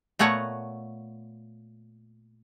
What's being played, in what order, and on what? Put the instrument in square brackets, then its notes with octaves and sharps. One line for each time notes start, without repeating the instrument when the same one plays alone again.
[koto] A#2 A3 B3 C#5 F#5 A#5